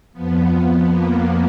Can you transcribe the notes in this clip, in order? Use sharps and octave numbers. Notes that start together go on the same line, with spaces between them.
F2 F3 B3
A#3